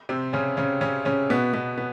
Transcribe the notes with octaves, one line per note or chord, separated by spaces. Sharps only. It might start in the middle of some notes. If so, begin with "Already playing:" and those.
C3 C4
C#3 C#4
C#3 C#4
C#3 C#4
C#3 C#4
B2 B3
B2 B3
B3